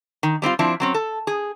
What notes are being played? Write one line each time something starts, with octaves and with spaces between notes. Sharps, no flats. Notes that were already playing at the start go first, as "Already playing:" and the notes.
D#3
G3 C4 D#4 F4
F3 C4 D4 E4
F#3 C4 C#4
A4
G#4